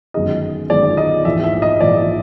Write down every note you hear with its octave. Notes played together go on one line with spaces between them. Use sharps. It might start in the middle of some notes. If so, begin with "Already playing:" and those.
G1 F#2 D#3 G#3 D#5
G1 F#2 D#3 G#3 D5
D#5
A#1 G#2 E3 E5
E5
D#5
A#1 G#2 E3 D5